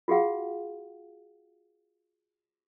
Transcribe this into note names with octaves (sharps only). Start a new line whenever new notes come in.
F4 F#4 G#4 F5 F#5